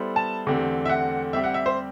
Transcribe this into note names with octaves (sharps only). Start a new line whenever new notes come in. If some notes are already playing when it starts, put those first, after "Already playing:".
Already playing: G3 B3 E4 A4 C5
A5
E2 D3 A3 C4 G4
E5
F#5
G3 C4 G4 E5
F#5
E5
C5